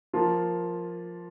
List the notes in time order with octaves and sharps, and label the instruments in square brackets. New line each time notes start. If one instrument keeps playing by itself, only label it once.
[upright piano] F3 A#3 F4